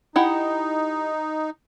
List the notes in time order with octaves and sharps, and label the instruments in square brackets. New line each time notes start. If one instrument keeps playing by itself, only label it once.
[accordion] D#4 [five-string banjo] E4 G4 F#5